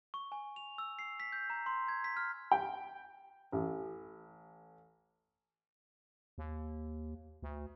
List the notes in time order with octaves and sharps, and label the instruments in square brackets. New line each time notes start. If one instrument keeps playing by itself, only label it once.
[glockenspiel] C#6
G#5
F7
E6
C7
B6
G6
A#5
C6
G#6
B6
F6
[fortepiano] G5
A1
[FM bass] D#2
D2